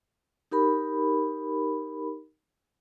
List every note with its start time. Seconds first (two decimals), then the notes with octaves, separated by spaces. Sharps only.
0.51 D#4 G4 A#4 B5